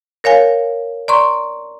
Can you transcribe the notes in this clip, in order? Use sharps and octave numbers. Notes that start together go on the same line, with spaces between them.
A#4 C#5 F5 G#5
D5 A#5 C6 C#6